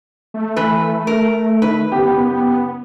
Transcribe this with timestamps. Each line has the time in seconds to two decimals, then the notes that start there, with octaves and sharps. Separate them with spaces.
0.34 A3
0.56 E3 B4
1.07 A#4
1.62 D#3 B4
1.92 F#1 B3 G4